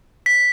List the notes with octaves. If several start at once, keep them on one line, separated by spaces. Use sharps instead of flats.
B6